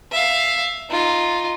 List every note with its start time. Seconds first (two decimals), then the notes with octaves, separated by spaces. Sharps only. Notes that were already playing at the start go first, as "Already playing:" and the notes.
0.11 E5 F5
0.90 D#4 F4